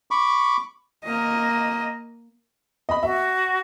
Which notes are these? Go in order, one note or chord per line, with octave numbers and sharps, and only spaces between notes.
B5 C#6 D6
A#3 D#5
D#5 B5
F#4 E5